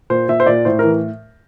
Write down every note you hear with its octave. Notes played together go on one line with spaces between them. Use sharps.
A#2 C5
A#2 E5
C5
A#2 D5
A2 C5
E3 A#4